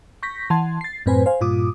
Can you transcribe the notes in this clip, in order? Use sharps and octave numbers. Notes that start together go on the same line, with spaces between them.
C#6 G6 A#6 B6
E3 F#5 A5 C6 G#6
A6 C7
F#2 A2 C4 B4 C5 G#5
C5 F5 G#5
G2 A#2 F4 D6 D#6